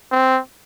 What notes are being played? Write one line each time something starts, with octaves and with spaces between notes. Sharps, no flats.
C4